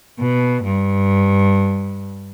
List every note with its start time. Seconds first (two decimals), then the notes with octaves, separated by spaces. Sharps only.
0.19 B2
0.63 G2